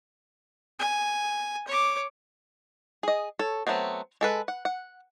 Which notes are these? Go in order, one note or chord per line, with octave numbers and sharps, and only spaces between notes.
G#5
C#5 D6
G#4 D#5
A4 C#5
F#3 A3 B3 C4
G#3 A4 B4
F#5
F#5